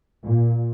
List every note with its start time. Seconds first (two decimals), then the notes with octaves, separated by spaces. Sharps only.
0.24 A#2